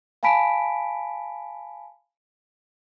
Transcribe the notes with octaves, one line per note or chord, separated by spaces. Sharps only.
F5 G#5 A5 B5 B6 D7